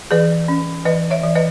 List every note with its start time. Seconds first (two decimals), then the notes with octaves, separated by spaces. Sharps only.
0.11 E3 G#4 B4
0.48 C#4
0.85 E3 B4 D#5
1.10 C#5 E5
1.24 E3
1.35 B4 D#5